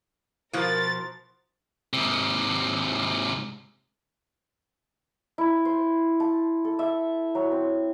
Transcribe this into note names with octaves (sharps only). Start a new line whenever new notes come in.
B2 F3 A#4 A6
G#2 C3
E4
C5
A5
A4
E5
F#3
C4